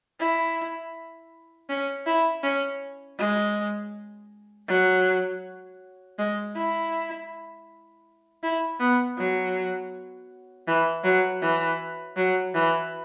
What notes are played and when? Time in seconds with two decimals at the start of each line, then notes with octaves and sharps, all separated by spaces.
0.20 E4
1.69 C#4
2.07 E4
2.44 C#4
3.19 G#3
4.68 F#3
6.19 G#3
6.56 E4
8.43 E4
8.80 B3
9.18 F#3
10.68 E3
11.04 F#3
11.42 E3
12.17 F#3
12.55 E3